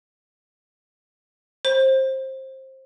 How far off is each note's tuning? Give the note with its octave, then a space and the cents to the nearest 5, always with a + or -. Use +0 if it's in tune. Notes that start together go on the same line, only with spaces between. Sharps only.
C5 +20